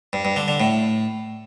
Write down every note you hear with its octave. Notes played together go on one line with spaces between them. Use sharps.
G2
G2
D3
D3
A2